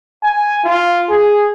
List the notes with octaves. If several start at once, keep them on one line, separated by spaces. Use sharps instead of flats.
G#5
F4
G#4